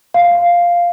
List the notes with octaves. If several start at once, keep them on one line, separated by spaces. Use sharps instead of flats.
F5